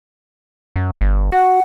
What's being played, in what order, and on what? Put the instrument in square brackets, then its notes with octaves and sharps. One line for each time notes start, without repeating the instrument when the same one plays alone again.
[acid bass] F#2
G1
[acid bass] F#4 [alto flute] F#5